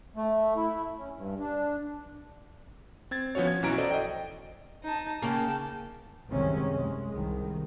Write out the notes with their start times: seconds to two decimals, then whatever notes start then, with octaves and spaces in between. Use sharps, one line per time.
0.16 A3
0.56 E4
0.97 C#4
1.15 G2
1.39 D4
3.11 C4 G#6 A6
3.35 F3 B3 C#4 F#4 C#5
3.47 G#6
3.63 B1 E3 C#4 F#4 A#5 D7
3.78 A4 C5 D5 D#5
3.91 D#5 G5
4.84 D#4 A5
5.22 C#3 A#3 C#4 G5 A5
6.28 C2 F#2 C3 D#3 G#3 C#4
6.77 G#3
7.13 C2 D#3